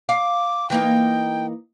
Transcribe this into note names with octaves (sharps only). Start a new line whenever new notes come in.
F5 D6
E3 A#3 D#4 G5